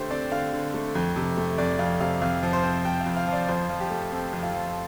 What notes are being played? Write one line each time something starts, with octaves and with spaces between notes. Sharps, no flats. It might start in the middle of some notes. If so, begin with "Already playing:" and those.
Already playing: D3 A3 G4 C5
C4 D5
D3 F5
D3
A3
F2
C3
A3
F2 D5
F2 F5
C3 F5
F2 F5
F3
C5
C4
F2 G5
F5
F2
F5
F3
D5
F2 C5
F3
G4
A3
C4 A4
F2
F4
F3